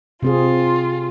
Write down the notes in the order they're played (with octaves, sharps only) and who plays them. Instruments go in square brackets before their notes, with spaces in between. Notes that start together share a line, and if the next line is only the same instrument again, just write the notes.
[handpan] C3 C4 G#4 [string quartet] F4